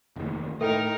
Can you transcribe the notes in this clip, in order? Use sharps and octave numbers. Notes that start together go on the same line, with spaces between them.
F1 D#2
A2 D#4 A4 A#4 E5 G5